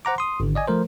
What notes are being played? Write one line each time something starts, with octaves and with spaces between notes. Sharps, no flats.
C5 F#5 A#5 D6
C6 D#6
G#1 D3
D5 D#5 G#5
F3 A3 A#4 C5